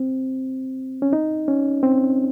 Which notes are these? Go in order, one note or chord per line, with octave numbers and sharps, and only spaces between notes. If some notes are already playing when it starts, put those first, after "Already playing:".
Already playing: C4
C#4
D#4
C#4
C4